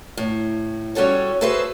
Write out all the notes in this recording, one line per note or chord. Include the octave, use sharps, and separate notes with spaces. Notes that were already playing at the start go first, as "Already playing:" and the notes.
A2
G3 C#4 F#4 A4 C#5
F#4 G#4 A4 B4 C5 E5